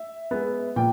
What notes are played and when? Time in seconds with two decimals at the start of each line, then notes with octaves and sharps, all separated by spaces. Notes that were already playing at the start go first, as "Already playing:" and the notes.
Already playing: E5
0.31 G#3 B3
0.76 A#2 G5